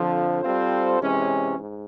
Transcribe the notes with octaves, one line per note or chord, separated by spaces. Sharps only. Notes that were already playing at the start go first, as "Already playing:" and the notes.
Already playing: F2 D3 F3
G3 C4 F4 A4 C5
C3 E3 G#3 C#4
G#2